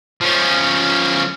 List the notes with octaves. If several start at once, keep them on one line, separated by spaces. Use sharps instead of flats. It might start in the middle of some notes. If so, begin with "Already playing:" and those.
F3 C#4